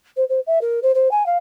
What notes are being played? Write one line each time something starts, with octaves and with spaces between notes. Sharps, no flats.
C5
C5
E5
A#4
C5
C5
G#5
F5